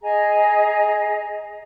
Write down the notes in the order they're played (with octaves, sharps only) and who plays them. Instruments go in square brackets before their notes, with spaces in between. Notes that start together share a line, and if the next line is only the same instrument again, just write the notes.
[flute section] G#4 D#5 G#5 A#5